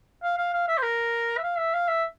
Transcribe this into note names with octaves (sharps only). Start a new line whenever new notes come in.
F5
F5
F5
E5
C5
A#4
E5
F5
E5
F5
E5